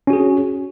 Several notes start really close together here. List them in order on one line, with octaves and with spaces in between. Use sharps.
C#4 F#4 G#4